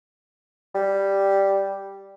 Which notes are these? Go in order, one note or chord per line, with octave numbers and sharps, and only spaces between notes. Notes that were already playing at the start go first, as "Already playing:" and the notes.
G3